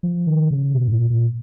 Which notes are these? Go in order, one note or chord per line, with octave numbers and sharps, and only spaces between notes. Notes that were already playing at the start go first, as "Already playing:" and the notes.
F3
D#3
C#3
B2
G#2
A#2
A#2